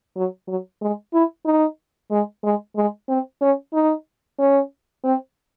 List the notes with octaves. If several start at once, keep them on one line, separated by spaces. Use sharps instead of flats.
F#3
F#3
G#3
E4
D#4
G#3
G#3
G#3
C4
C#4
D#4
C#4
C4